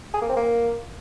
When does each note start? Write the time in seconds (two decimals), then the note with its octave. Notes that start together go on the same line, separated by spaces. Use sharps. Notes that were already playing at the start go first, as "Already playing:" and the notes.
0.14 G#4
0.22 A#3
0.29 C4
0.37 A#3